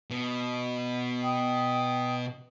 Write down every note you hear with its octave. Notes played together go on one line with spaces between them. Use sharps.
B2
G5 D#6